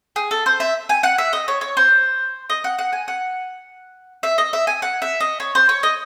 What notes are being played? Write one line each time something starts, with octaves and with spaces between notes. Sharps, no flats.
G#4
A4
C5
E5
G#5
F#5
E5
D#5
C#5
C#5
C5
D#5
F#5
F#5
G#5
F#5
E5
D#5
E5
G#5
F#5
E5
D#5
C#5
C5
C#5
D#5